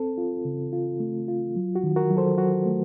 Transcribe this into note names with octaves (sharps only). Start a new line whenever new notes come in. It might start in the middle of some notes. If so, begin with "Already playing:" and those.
Already playing: C4 A4
F4
C#3
F4
A3
F4
F#3
F#4
D#3
F#4 A#4
F#3
A4 C5
F#3 F#4
A3